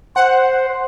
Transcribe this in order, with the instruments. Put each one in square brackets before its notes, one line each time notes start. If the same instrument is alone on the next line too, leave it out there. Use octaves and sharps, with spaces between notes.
[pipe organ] C5 [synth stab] F#5